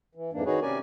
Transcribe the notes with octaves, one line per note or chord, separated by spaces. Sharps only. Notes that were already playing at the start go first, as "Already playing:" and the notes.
E3
F2 G#2 E3 A#3 D4
D#3 D#4 F#4 G#4 B4 C#5
C3 C#4 A#4 D5 G#5